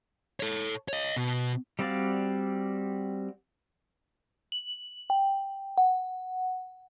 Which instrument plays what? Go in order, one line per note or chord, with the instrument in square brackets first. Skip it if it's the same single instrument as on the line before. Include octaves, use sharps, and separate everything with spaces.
[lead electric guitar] A4 C#5
C#5 D#5
B2
[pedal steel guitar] G3 C4 F#4 D5 F5
[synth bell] F#7
G5
F#5